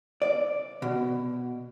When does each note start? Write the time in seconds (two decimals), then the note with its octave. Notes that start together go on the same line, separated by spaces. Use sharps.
0.22 D5
0.82 B2